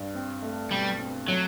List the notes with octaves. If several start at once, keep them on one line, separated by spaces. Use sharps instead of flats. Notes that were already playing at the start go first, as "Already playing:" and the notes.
Already playing: G2
C4
A3
B2 G3
C4
F#3 A3